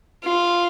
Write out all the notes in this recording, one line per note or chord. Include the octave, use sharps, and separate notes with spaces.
F4